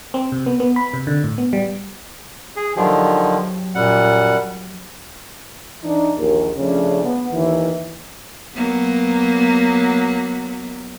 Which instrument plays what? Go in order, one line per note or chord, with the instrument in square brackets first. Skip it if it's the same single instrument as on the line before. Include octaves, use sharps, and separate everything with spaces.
[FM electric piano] C4
C3
B3
B3
B5
C3
D3
A2
B3
G3
[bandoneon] G#4
[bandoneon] D3 D#3 F3 [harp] F#3 G4
[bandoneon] F#2 G3 F#5 [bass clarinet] A#2
[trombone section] E3 D4 D#4
A#1 D#2
C#3 F3 A3 C#4 D4
B3
D#2 D#3 E3
[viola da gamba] F#3 A#3 B3